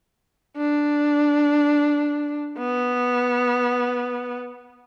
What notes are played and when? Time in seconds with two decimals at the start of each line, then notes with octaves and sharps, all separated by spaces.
0.57 D4
2.58 B3